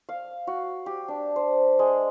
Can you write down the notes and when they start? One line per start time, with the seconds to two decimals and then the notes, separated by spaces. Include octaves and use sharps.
0.09 F5
0.47 F#4
0.86 G4
1.08 D4
1.36 C5
1.79 G#3